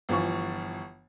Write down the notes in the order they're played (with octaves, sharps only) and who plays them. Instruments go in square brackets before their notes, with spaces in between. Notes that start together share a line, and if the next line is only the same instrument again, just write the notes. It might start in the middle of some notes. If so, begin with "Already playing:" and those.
[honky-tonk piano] G1 E3 F3 C#6